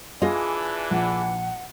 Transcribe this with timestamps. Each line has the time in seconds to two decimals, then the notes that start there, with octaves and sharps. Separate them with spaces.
0.22 E3 D4 F4 G#4 D#5
0.91 A#1 F#5